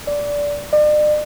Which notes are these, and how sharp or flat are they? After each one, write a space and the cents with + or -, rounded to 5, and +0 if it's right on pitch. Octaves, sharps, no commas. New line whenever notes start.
D5 -15
D5 +40